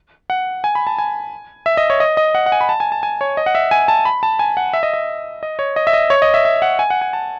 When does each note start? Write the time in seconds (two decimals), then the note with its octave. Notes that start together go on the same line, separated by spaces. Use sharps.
0.30 F#5
0.64 G#5
0.75 B5
0.87 A5
0.98 G#5
1.66 E5
1.77 D#5
1.90 C#5
2.00 D#5
2.17 D#5
2.35 F#5
2.46 F#5
2.52 G#5
2.61 B5
2.69 A5
2.80 G#5
2.92 A5
3.03 G#5
3.21 C#5
3.37 D#5
3.46 F#5
3.55 E5
3.71 G#5
3.88 A5
4.05 B5
4.23 A5
4.39 G#5
4.57 F#5
4.73 E5
4.83 D#5
4.94 E5
5.43 D#5
5.59 C#5
5.76 D#5
5.87 E5
5.93 D#5
6.10 C#5
6.22 D#5
6.34 E5
6.45 E5
6.62 F#5
6.79 G#5
6.90 F#5
7.02 G#5
7.13 A5